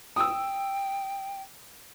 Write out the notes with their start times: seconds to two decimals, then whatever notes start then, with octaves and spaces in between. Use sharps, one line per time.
0.16 G5 D#6 E6